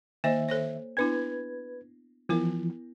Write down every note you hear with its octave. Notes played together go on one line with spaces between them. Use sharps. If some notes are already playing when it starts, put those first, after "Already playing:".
D#3 A#3 C5 D#5 E5
A4 C5 C#5
B3 D4 E4 B4 G#6
E3 F3 B3 E4 A#4